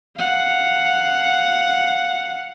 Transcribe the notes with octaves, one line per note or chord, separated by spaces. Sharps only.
F5 F#5